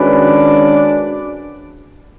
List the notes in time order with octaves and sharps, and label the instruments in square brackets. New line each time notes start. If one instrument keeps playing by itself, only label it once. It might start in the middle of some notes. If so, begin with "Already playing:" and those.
Already playing: [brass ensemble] D#3 G#3 C#4 F#4 B4 [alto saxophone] D4